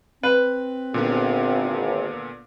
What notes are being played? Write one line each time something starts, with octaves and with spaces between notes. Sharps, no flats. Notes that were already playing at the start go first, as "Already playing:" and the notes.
C4 B4
G#1 A#2 D3 B3